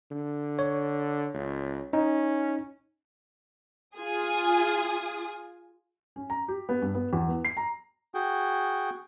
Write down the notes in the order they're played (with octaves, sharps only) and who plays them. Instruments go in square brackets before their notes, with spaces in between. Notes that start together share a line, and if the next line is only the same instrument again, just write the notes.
[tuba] D3
[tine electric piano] C#5
[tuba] C#2
[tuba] C#4 [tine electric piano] D#4
[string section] F4 G#4 G#5 D#6
[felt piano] C#4
A#5
G4
B3
G2
B3
E2
B3
C7
A#5
[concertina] F#4 G#4 G5